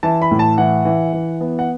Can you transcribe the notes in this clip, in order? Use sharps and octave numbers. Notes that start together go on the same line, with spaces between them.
E3 A5
B5
A2
A5
E3 F#5
E3
E3
B3
F#5